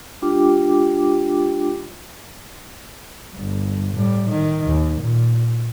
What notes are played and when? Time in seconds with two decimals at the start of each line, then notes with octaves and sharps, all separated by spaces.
0.22 G#3 D4 F4 G4 G5 D6
3.35 G1
3.95 A2 G3
4.30 D#3
4.65 D#2
5.01 A#2